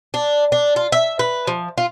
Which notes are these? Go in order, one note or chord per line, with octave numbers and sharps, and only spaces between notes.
D4
D4
F4
E5
B4
F3
F4